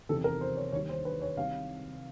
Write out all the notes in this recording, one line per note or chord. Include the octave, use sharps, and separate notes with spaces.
E2 C3 D#3 A4
A#4
C5
C#5
D#2 D#3 G3 C#5
C5
B4
C#5
C2 C3 D#3 F5